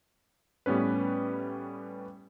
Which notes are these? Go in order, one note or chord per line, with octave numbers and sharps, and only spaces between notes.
A2 G3 B3 C#4 B4